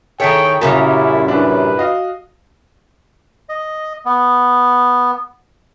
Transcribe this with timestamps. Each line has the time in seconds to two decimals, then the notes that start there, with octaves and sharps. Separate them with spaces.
0.20 D#3 E4 G#4 A4 C#5 G5
0.61 F#2 A#2 C#3 G3 E4
1.28 D4 E4 B4
1.77 F#4 D#5 F5
3.49 D#5
4.05 B3